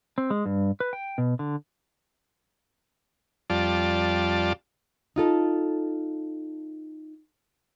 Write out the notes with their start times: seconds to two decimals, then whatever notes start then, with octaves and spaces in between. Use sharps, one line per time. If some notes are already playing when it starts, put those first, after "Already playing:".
0.18 C4
0.30 G#3
0.46 G2
0.80 B4
0.93 G5
1.18 B2
1.39 D3
3.50 F2 G3 F4 D5 A5
5.16 D#4 F4 A4